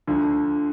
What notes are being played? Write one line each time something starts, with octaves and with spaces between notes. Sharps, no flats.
D2 D3 F3